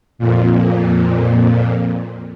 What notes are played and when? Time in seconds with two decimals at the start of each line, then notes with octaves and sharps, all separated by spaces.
0.19 F2 A#2